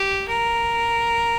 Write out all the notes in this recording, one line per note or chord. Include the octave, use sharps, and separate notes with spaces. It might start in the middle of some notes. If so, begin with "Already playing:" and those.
Already playing: G4
A#4